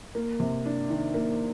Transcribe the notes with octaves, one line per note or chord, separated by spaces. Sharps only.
A#3
C3
D4
D#3
A#3